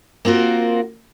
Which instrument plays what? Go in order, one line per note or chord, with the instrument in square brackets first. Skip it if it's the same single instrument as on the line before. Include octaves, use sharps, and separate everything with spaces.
[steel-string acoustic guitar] A#3 C4 F4 F#4 A#4